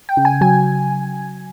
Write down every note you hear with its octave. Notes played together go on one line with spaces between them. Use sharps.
G5
C#3
G#5
F#3 G#5